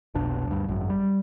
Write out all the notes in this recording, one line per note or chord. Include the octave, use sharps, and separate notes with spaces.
F1 B1 D4
D2 G2
G#1 F#2
G3